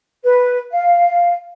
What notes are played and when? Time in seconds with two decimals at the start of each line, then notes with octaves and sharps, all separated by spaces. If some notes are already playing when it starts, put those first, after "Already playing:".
0.24 B4
0.71 F5